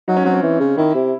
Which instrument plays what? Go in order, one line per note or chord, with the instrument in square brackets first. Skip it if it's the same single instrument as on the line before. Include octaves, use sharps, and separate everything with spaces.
[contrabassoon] F#3 [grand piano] D#4
[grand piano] C#4
[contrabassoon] F#3 [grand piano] C4
[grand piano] C#4
[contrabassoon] E3
C#3
[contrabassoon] D#3 [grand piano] E4
[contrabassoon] C3